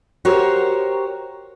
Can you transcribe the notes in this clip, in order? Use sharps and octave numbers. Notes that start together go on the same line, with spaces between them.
F#4 G4 A#4 C5 C#5